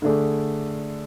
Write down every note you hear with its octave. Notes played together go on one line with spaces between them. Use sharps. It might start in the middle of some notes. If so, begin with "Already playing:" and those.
D3 A3 D4 G#4